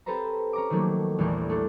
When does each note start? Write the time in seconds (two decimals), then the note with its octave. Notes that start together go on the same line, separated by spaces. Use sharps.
0.06 C4 G4 A4 B4 C5 A#5
0.53 C#4 A#5 D6
0.70 D#3 F3 F#3 A3 A#3
1.18 A#1 E2 E3 G3 A3
1.49 A3 D4 A4